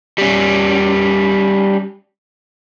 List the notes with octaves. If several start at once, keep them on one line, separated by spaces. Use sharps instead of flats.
G3 C#4